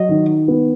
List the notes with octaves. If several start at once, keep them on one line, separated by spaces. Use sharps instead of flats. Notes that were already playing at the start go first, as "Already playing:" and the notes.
Already playing: F#3 D#5
D#3
B3